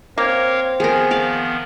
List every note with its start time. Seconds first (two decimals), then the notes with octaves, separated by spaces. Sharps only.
0.18 A#3 C4 A#4 C#5 F5
0.80 D#3 F3 B3 G#4 A#4
1.11 D5 F5